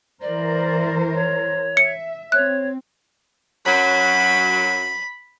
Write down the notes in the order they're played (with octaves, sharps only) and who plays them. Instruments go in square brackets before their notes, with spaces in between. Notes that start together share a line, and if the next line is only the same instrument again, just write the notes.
[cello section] E3 A#4 C5 [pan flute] D5
[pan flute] C#5
[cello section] E5 [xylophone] C#7
[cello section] C4 [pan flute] C#5 [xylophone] F#6
[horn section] F#2 F#3 [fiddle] B5